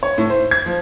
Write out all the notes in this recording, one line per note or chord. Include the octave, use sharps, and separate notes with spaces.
C#5
A2
C5
G#6
F3